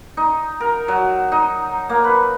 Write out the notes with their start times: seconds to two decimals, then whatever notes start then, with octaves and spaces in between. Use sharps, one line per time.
0.17 D#4
0.60 A#4
0.88 F#3
1.32 D#4
1.89 A#3
2.04 B4